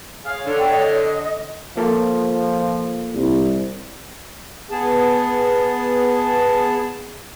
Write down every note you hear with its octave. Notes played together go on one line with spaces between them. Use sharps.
G#4 C#5 F5
D3
G5
D#5
F3 A#3 F4 A4
C2
B3 G#4 A5